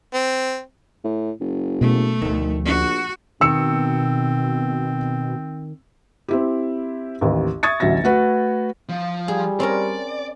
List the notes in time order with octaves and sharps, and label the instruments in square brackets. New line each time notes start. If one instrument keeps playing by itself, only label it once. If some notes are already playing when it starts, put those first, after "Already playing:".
[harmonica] C4
[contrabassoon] A2
F#1
[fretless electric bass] B2 [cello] A3
[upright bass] D2 F3 [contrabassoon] D#3
[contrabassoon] A#1 [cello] F#4
[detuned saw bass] B2 [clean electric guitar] D#3 [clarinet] C4 [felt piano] E6 C#7
[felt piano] C4 E4 G4
A1 D#2
E5 C#6 D#6 G#6 A6 C#7
A1 D2 F#3 E5 A#6
A3 F#4 B4
[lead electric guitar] F3
[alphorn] G3 [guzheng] G#4
[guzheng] C4 C#4 A#4 [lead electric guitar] D5